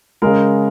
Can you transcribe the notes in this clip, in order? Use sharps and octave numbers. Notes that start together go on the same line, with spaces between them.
C#3 G#3 A#4